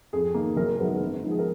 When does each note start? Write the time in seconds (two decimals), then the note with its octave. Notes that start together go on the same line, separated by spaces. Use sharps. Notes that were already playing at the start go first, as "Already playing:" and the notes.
0.13 F2 G#4
0.34 D#3 A#3
0.57 F#1 A#4
0.79 F#2 D#3 G#3 B3
1.01 G#1
1.23 G#2 F3 B3
1.31 G#4
1.39 A#4